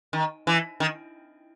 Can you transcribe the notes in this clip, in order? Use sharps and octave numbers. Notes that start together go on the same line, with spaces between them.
D#3
E3
D#3